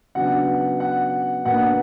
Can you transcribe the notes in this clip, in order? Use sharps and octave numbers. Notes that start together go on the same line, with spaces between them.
C#3 F#3 B3 D4 F#5
F#5
B2 A#3 D4 F#5